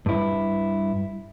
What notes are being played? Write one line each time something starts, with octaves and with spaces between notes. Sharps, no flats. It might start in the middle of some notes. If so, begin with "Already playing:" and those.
G2 E4